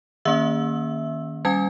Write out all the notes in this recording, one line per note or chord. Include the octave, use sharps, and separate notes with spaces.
D#3 A#3 C#4 E5 E6
G3 C#4 G#5 G#6